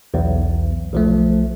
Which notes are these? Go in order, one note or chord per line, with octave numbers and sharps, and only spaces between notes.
B1 E2
B1 F3 A3